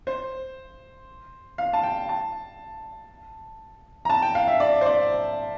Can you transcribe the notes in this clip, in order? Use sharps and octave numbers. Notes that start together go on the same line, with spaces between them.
C5
F5
A5
G5
A5
A#5
A5
G5
F5
E5
D5
C5
D5